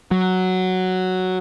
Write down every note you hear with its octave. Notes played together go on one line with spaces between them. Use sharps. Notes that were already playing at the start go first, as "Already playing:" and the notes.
F#3